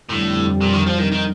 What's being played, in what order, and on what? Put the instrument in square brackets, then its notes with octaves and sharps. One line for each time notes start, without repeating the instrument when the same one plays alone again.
[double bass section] F2 D3 G3 [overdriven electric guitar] A2
[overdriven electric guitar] A#2
D#3
F3
D#3
D#3